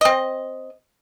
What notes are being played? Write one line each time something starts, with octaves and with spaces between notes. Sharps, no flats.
C4 D#5